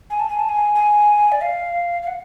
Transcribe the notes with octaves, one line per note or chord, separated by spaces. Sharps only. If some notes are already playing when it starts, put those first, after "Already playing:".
G#5
A5
G#5
A5
G#5
G#5
D5
F5
F5
F#5